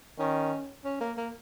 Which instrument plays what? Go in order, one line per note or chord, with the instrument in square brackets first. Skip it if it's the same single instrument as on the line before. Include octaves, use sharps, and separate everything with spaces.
[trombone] D#3 [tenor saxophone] C#4
[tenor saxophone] C#4
A#3
A#3